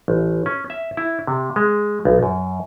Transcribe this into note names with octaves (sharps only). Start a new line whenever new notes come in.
A1
C#4
E5
E4
C3
G#3
B1
F#2